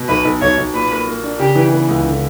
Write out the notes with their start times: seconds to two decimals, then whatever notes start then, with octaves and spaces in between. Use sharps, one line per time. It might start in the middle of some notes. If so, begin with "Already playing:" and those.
Already playing: B2
0.08 B1 B4
0.25 B1
0.41 B1 C#5
0.58 B1
0.74 A#2 B4
0.91 A#3
1.07 A#3
1.23 D4
1.39 C#3 G4
1.55 E3
1.72 B3
1.89 C#2
2.05 D3